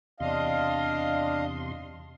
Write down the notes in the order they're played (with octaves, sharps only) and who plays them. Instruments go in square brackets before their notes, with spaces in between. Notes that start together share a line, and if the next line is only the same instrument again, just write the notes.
[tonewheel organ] E2 C3 C6 [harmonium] D4 D#5 F5